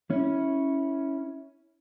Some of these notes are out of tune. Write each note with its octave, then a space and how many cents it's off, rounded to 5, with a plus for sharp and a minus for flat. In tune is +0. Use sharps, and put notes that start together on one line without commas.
C#4 +0 E4 -15